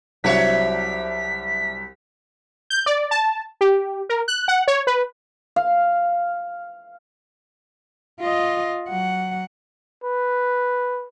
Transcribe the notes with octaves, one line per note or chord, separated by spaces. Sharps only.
C2 F#3 C4 D4 C#5 E5 B6
G6
D5
A5
G4
A#4
F#6
F#5
C#5
B4
F5
F4 D#5
F#3 F#5
B4